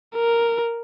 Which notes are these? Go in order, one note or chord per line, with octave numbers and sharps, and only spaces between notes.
A#4